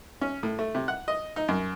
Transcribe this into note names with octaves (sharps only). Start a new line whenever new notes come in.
C#4
A2
A3
C3
F#5
D#5
D#4
F#2